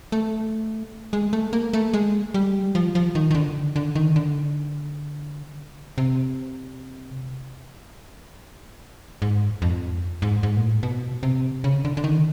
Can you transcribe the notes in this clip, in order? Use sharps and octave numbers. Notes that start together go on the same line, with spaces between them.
A3
G#3
A3
A#3
A3
G#3
G3
F3
F3
D#3
D#3
D3
D3
D#3
D3
C3
G#2
F2
G#2
G#2
A#2
A2
B2
C3
C#3
D3
D3
D#3